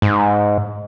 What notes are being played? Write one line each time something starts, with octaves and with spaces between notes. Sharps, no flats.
G#2